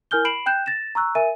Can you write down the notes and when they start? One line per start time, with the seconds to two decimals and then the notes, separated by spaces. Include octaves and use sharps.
0.11 E4 A#4 G#5 F6 G6 G7
0.25 B5 C7 D7 E7 F#7
0.46 G5 F#6 G6 E7
0.66 A6 A#6 E7
0.95 A#5 C#6 E6 F#6
1.15 A#4 E5 G#5 D#7